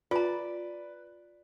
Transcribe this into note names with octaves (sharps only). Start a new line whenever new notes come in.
F4 B4 D5 A#5